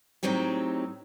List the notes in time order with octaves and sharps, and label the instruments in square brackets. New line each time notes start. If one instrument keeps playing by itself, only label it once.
[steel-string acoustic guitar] A2 F#3 C4 D#4 G4